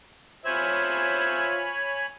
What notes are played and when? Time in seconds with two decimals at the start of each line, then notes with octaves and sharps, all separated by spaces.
0.45 F4 C5 C#5 E5 G#5 B5